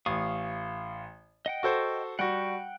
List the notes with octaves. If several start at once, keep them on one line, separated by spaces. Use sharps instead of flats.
A1 F5 C#6 D#6
D#5 F#5 G5
F#4 A4 C5
G3 F#4 F#5 G5